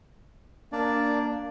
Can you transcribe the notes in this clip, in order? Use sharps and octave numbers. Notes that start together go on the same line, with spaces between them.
A#3 D4 D5